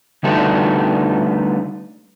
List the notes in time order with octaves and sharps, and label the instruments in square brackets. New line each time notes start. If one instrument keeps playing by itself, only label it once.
[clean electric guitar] D3 G3 A3 B3 D#4 A4